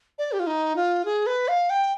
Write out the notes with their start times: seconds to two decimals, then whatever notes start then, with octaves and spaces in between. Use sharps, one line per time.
0.18 D5
0.32 G4
0.40 F4
0.47 D#4
0.76 F4
1.05 G#4
1.27 B4
1.48 F5
1.70 G5